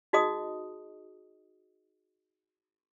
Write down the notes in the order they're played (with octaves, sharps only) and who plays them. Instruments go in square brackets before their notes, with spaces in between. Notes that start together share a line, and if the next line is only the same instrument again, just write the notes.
[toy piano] D#4 F#4 G#4 D#5 D#6